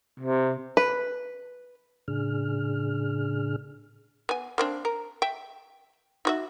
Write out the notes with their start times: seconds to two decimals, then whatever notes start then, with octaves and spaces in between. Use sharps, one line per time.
0.20 C3
0.77 B4
2.08 A2 C#3 D4 G#4 F6
4.29 B3 G#5
4.58 A#3 C4 D4
4.85 A#4
5.22 E5 G5
6.25 D#4 F#4 E5